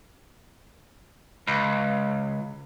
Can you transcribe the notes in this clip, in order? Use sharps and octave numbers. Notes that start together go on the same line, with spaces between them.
C#2